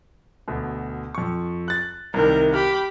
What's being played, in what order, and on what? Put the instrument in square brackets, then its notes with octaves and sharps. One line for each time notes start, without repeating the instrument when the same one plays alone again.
[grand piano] D2 B2
F2 C#6
F#6 A6
[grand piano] C2 C3 D#3 [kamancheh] A#4
[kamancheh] G4 B5 [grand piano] F6